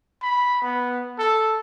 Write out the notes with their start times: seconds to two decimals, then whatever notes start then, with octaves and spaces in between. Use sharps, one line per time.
0.22 B5
0.62 B3
1.19 A4